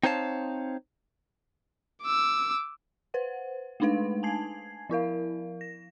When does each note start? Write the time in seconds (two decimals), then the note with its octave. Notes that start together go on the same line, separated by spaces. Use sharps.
0.03 C4 D#4 C5 C#5 F5 A5
2.02 D6 E6
3.14 B4 C5 F#5
3.80 G#3 A3 D4 D#4 B4 F5
4.23 G#5 A5 G#6 C7
4.89 F3 E4 A#4 F5
5.61 A#6